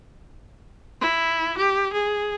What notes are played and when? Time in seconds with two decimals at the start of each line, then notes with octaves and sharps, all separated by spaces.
1.01 E4
1.57 G4
1.93 G#4